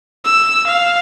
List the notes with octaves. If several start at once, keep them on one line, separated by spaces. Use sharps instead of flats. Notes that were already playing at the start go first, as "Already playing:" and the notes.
E6
F5